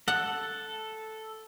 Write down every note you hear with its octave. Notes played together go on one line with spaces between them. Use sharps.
A4 F#5